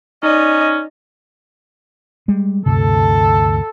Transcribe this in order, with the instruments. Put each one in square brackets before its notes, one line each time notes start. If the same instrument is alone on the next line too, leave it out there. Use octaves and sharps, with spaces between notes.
[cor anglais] C#4 [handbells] D#4 D5 [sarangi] D#5
[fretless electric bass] G3 G#3
[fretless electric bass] D2 G2 C3 [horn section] A4